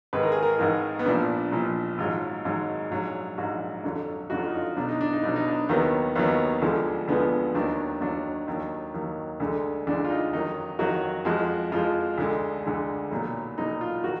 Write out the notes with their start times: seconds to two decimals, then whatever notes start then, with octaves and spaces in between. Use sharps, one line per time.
0.13 G#1 G#2 D#3 B4
0.23 A#4
0.32 G#4
0.43 A#4
0.59 G#1 G#2 D#3
0.99 B3
1.05 A#1 A#2 F3 D4
1.52 A#1 A#2 F3
1.98 G#1 G#2 F#3 F4
2.45 G#1 G#2 F#3
2.91 A#1 G#2 F#3
3.38 A#1 G#2 F#3 F#4
3.84 F2 D3 F#3
4.30 F2 D3 F#3 F#4
4.39 F4
4.47 D#4
4.56 F4
4.76 B1 B2 F#3 D4
4.88 D#4
5.01 D4
5.12 D#4
5.23 B1 B2 F#3 D4
5.36 D#4
5.48 D4
5.69 D#2 D#3 F#3 B3
6.15 D#2 D#3 F#3 B3
6.62 D2 D3 F3 G#3
7.08 D2 D3 F3 G#3 B3
7.55 D#2 D#3 F#3 D4
8.01 D#2 D#3 F#3 D4
8.48 D#2 D#3 F#3
8.94 D#2 D#3 F#3
9.40 D2 D3 G#3
9.87 D2 D3 G#3 D4
10.04 F4
10.10 D#4
10.33 F2 D#3 F#3 D#4
10.79 F2 D#3 F#3 F#4
11.25 F2 F3 G#3 F#4
11.72 F2 F3 G#3 F4
12.18 D2 D3 G#3
12.64 D2 D3 G#3
13.11 B1 A#2 F#3
13.58 B1 A#2 F#3 D#4
13.81 F4
14.04 D#3 F#3 F#4